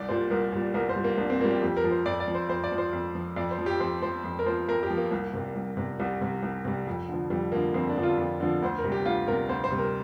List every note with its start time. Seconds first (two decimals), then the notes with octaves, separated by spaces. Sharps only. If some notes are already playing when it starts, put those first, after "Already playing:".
Already playing: C2 D5
0.09 A#2 G3 C5
0.31 C2 A#4
0.52 A#2 G3
0.74 C2 A#4
0.89 C5
0.96 A#2 G3
1.04 A#3
1.18 C2 D4
1.30 C4
1.40 A#2 G3 A#3
1.51 G4
1.62 F2 G4
1.77 A#4
1.84 F3
1.91 C5
2.06 F2 D5
2.20 D5
2.28 F3
2.35 C5
2.49 F2 C5
2.64 D5
2.72 F3
2.78 C5
2.93 F2
3.15 F3
3.36 F2 D5
3.51 C5
3.58 F3
3.66 G4
3.80 F2 C5
4.02 F3 C5
4.24 F2
4.39 A#4
4.46 F3 C5
4.68 F2 A#4
4.83 G4
4.90 F3
4.97 A#3
5.11 C2
5.34 C3 G3
5.55 C2
5.77 C3 G3
5.99 C2 G3
6.21 C3 G3
6.43 C2
6.65 C3 G3
6.87 F2
7.09 D3 F3
7.30 F2 G3
7.52 D3 F3 A#3
7.74 F2 C4
7.89 D4
7.97 D3 F3
8.03 F4
8.18 F2
8.40 D3 F3
8.62 D2 C5
8.78 A#4
8.84 C3 G3
8.92 G4
9.05 D2 F4
9.27 C3 G3 A#4
9.49 D2 C5
9.64 C5
9.70 C3 G3
9.79 A#4